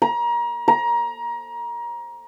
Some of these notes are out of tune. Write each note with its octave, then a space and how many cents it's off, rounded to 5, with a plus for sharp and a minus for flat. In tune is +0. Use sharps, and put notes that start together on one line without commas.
A#5 +30
A#5 +25